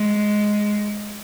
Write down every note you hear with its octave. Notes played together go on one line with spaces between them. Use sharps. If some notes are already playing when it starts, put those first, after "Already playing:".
Already playing: G#3